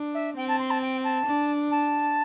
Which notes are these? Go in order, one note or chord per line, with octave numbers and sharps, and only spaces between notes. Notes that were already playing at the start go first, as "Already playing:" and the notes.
Already playing: D4
E5
C4 G5
A5
C6
A5
G5
A5
D4
A5